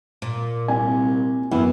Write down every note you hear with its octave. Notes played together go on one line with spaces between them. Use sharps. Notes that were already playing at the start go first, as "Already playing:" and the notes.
A#2
C2 G#5
F#2 E3 B3